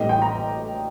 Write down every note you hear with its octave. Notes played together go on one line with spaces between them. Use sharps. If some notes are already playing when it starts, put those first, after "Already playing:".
Already playing: A1 A2 G3 D#5
G5
A#5